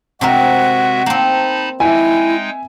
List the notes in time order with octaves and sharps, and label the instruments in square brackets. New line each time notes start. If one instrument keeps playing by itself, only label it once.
[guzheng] C3 C4 A#4 [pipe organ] G#3 F#4 E5 [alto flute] F#5
[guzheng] A#3 C4 [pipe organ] D#4 A5 B5
[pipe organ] G#3 D#4 G5 [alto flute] E4 [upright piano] E5 G#5